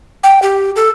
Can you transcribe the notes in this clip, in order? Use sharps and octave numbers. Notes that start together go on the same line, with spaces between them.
G5
G4
A4